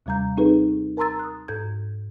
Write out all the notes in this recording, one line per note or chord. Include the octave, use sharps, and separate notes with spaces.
D#2 C3 G3 A#5 G6
C4 D#4 G#4 A4 B4
A#4 A5 A#5 C6 E6 A6
D#6 F#6
G#2 A4 G6 G#6